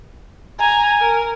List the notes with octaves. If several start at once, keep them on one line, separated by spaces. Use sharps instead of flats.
G#5 A#5
A#4